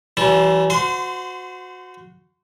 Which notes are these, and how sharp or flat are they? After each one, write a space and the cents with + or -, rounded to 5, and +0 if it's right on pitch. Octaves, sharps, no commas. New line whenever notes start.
E3 +10 G3 -45 A5 -15
F#4 -15 C5 -35 C6 -15